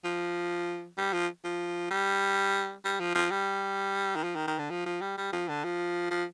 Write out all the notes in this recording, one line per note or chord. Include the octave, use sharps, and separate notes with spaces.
F3
G3
F3
F3
G3
G3
F3
F3
G3
D#3
F3
D#3
D#3
D3
F3
F3
G3
G3
F3
D3
F3
F3